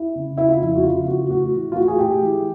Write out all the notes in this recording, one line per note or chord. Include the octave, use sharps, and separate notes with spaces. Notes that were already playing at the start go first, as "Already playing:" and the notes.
Already playing: E4
C#3
C#3 E4
F4
F2 E4
F#4
C#3 F4
C#3 F#4
A2 F#4
E3
F4
A2 F#4
G#4
A2 G4
E3